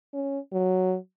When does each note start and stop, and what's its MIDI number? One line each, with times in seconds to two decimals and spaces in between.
0.14 0.39 61
0.53 0.96 54